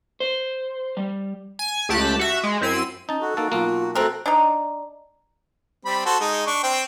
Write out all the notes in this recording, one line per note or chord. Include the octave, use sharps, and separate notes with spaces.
C5
G3
G#5
C#2 A3 G4 A5 B5 F#6
F#4 E5
G#3
F#2 C4 E4 E6 C7 D#7
C#4 D#4 A5
F#4 A4
A#3 D#4 A4
B1 A#3 F4
A3 C4 F#4 A4 A#4 F#6
D4 D#4
G3 C4 B5
F#4 A4 C5
G#3 D#4
D4 C#6
C4 G5